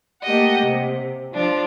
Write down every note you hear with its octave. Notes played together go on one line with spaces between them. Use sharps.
A3 A#3 G4 D#5 F#5
C3
F3 D4 F4